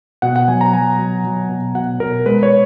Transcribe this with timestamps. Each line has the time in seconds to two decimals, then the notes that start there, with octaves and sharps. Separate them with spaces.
0.22 B2 F#5
0.36 F#5
0.48 F#3 G#5
0.61 A#5
0.73 F#3 G#5
0.98 F#3
1.24 F#3
1.49 B2
1.75 B2 F#5
2.00 B2 A#4
2.26 G#3 B4
2.43 C#5